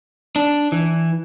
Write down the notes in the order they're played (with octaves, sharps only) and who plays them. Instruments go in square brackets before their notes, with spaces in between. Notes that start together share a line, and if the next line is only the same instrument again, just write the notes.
[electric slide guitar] D4
E3